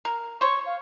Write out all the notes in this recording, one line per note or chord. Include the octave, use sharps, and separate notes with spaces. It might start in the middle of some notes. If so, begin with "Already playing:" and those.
A#4
C5 C#5 C#6
F5